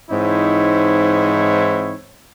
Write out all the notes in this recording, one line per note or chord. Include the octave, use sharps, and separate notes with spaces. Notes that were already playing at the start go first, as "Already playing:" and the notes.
G#2 E3 C4 D#4 E4 C#5